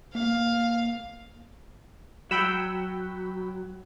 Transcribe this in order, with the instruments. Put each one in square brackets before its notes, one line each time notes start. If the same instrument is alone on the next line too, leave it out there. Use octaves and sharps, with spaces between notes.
[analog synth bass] A#3 [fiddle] F5
[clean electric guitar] F#3 [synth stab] G5 B5 E6